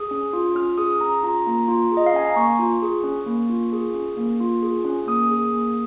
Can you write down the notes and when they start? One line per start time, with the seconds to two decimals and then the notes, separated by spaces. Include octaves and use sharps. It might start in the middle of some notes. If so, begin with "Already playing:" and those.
Already playing: G#4 D#6
0.11 C#4
0.33 F4
0.55 C#4 F6
0.78 G#4 D#6
1.01 C#4 A#5
1.23 F4 A#5
1.46 A#3
1.68 F4
1.91 G#4
1.97 D#5
2.06 F5
2.13 C#4 G#5
2.27 A#5
2.36 A#3 C#6
2.59 F4
2.82 G#4
3.04 C#4
3.26 A#3
3.49 F4
3.72 G#4
3.94 C#4
4.17 A#3
4.40 F4
4.62 G#4
4.85 C#4
5.07 A#3 D#6
5.30 G#4
5.53 A#3